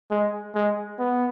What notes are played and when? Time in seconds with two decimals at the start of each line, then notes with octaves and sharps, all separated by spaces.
0.11 G#3
0.55 G#3
0.99 B3